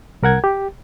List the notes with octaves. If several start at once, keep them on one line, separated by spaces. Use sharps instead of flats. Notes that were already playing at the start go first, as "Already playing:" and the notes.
C2 A#4 F#5 G#6
G4